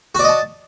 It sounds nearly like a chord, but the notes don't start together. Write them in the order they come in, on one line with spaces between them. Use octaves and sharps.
F#4 D5 D#5 A5